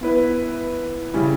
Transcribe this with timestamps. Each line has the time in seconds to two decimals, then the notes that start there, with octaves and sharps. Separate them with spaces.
0.01 B3 E4 B4
1.14 C#3 G3 C#4 E4